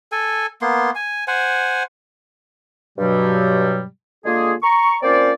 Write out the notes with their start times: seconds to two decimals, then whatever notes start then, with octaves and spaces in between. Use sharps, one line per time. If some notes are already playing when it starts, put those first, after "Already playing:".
0.12 A4 G#5
0.62 A#3 B3 C6
0.95 G#5
1.28 C5 F#5 G#5
2.98 G2 B2 F#3 G3
4.25 D3 G#3 A#3 F4 G#4
4.63 A#5 C#6
5.02 A#3 C4 C#4 F4 C5 D5